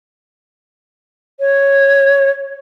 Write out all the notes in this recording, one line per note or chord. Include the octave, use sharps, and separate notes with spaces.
C#5